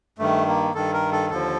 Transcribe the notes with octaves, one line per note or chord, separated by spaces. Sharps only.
G2 D#3 A3
A#3
G2 D#3 A4
A#4
A4
D#2 D3 F3 A4